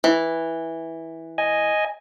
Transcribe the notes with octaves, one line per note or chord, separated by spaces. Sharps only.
E3
D#5 G#5